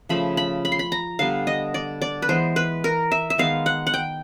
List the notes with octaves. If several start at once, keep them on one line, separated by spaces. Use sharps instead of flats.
C#3 F3 A3 B5
B5
B5
C6
B5
A#5
D3 G3 B3 F5
D#5
D5
D5
B4
E3 G#3 B3 C5
B4
A#4
E5
E5
D#3 G#3 B3 F5
F#5
F#5
G5